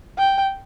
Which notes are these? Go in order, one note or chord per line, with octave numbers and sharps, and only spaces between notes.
G5